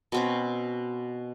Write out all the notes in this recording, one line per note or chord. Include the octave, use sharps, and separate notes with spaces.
B2 C4 C#4